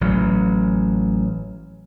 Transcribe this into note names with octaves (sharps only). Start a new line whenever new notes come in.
A1 F#3